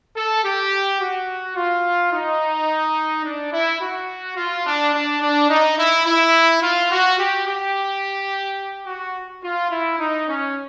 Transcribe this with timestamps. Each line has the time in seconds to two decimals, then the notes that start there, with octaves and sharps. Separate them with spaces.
0.16 A4
0.44 G4
1.00 F#4
1.56 F4
2.12 D#4
3.25 D4
3.53 E4
3.81 F#4
4.37 F4
4.66 D4
4.94 D4
5.21 D4
5.50 D#4
5.78 E4
6.06 E4
6.62 F4
6.91 F#4
7.19 G4
7.46 G4
8.87 F#4
9.43 F4
9.71 E4
9.99 D#4
10.27 C#4